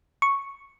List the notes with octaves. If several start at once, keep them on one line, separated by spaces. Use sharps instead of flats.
C#6